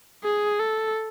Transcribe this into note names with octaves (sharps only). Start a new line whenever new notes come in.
G#4
A4